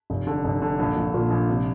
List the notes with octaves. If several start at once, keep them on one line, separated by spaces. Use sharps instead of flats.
F1
D3
F1
D3
A#1
A#1
A#2
A#1
C3